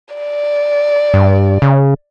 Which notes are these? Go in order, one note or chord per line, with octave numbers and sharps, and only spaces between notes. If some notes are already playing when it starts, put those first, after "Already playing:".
D5
G2
C#3